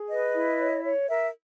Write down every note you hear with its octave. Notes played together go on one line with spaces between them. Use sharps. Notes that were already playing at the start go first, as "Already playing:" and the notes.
Already playing: G#4
B4 D#5
E4
C#5
C#5
A#4 E5